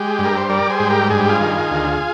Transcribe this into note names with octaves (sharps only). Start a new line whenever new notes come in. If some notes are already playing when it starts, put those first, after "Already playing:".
Already playing: G#3 G4
G2
A#4
C5
G3 A#4 D5
G#4 C5
G#2
G4 A#4
G2 G#4
G4
F4 G#4
D#3
D2